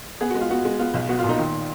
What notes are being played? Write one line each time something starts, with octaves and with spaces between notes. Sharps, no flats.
B3 G#4
G#3 F#4
F4
B3 F#4
G#3
B3 F4
B1
B3 F#4
F4
A#2
D#4
D#3